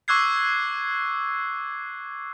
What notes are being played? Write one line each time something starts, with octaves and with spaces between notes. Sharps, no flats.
C#6 D6 E6 F#6 G#6 C7